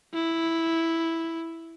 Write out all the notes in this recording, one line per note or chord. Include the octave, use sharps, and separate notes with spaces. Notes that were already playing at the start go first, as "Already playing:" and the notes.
E4